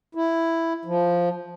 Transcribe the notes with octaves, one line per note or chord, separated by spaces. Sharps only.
E4
F3